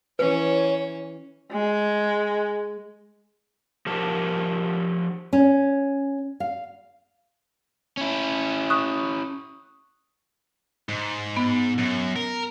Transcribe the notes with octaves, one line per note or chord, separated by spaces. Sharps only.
E3 C#4 B4 C#5
G#3
F3 G4 A#4 A5
C#4
F5
C#4 E4
C#6 D#6 F#6
G#2
B3
F#2
A#4